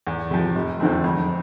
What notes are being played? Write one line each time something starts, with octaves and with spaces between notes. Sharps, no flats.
E2
C3 F3
F1
E2 D3 F3 C4
F2